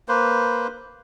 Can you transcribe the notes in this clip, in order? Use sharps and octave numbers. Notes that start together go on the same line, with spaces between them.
A#3 B4 C5